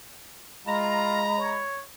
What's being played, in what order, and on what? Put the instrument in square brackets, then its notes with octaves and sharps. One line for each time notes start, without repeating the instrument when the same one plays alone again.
[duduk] G#3 [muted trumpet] F4 [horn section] A#5 [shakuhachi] B5
[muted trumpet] C#5